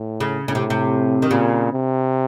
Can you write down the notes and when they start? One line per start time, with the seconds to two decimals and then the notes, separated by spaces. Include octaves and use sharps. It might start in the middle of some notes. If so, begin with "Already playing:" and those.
Already playing: A2
0.20 C#3
0.48 A2 C#3
0.55 C3
0.70 C3
1.22 D#3
1.30 A#2 C#3
1.73 C3